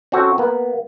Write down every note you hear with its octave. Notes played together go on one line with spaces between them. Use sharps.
C4 C#4 F#4 A4
A#3 B3